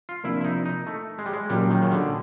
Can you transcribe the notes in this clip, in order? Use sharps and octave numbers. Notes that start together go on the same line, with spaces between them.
F4
C3 F3 A#3 D4 E4
E4
D#4
D#4
A3
G#3
G3
G#3
A#2 F#3 G3 A#3 C#4
D#3
C#3
D3